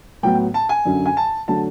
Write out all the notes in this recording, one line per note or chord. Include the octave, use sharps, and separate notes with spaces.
A2 F#3 B3 G5
A5
G#5
F#2 D3 F#3
G#5
A5
D3 F#3 A3 A5